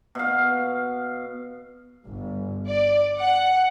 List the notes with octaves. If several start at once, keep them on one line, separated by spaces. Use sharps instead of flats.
B2 F5
G1
D5
F#5